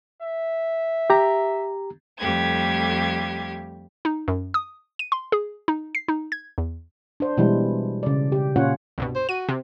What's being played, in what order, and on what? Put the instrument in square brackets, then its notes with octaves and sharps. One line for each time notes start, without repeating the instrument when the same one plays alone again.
[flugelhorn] E5
[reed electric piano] G4 A#5
[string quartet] F2 G3 A3 G4 G#6
[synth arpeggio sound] D#4
F#2
D#6
D#7
C6
G#4
D#4
C7
D#4
G#6
E2
[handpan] D4 C5
B2 E3 G3 G#3 E4
C#3 D5
G4
A#2 C#4 F4 C#5 F#5
[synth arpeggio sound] C2 G2 B2
[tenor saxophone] C5
[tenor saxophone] F#4 [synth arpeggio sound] D#7
[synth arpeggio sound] C3